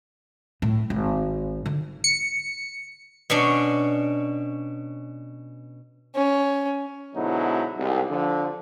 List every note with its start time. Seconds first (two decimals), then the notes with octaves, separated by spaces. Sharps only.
0.62 A2
0.90 G#1
1.66 D3
2.04 C#7
3.30 B2 C#4 D4
6.15 C#4
7.15 G#2 B2 D3 F#3 D#4 E4
7.77 C2 G#2
8.09 D3 F3